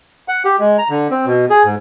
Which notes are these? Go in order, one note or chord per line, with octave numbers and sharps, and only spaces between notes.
F#5
G4
G#3
A#5
D3
C4
B2
G#4
G#2